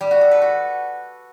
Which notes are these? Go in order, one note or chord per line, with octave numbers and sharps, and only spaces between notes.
G3
F#4
A4
B4
F#4